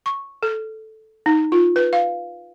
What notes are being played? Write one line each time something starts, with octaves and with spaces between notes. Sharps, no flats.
C#6
A4
D#4
F4
B4
F5